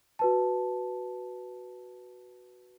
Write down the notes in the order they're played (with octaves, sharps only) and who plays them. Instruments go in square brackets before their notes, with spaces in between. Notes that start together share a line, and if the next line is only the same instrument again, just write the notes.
[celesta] F#4 B4 A5